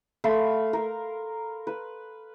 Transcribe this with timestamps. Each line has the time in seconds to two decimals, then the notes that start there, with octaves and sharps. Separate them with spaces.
0.24 A3 F5 B5 C6
0.73 A#4
1.67 B4